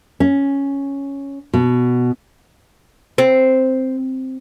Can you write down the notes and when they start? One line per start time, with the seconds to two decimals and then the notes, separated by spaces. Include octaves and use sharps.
0.20 C#4
1.53 B2
3.18 C4